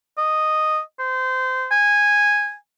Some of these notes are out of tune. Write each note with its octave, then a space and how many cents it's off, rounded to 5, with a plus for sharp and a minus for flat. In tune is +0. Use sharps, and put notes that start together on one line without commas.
D#5 -5
C5 -25
G#5 -10